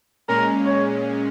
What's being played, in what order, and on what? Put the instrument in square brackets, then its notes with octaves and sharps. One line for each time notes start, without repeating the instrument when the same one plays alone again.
[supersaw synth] A#2 G#3 C#4 [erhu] A#4
[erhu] C#5